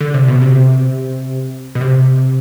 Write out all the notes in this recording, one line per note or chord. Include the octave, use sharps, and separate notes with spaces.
D3
C3
B2
C3
B2
C3